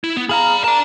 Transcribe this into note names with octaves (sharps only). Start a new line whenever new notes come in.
E4
B3
G#4 D5 F5 A#5 B5
A#4 D5 A5